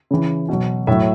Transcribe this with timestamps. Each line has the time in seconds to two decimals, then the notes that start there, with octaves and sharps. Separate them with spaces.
0.11 C#3 E3
0.49 B2 F#3
0.87 A2 F#3 E5